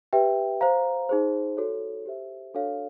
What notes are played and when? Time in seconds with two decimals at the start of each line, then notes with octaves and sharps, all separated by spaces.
0.13 G4 B4 E5 G5
0.61 C5 F5 A#5
1.09 D#4 G#4 C5
1.57 F#4 A4 C#5
2.06 G4 C5 E5
2.54 D4 F#4 A4 C#5 F5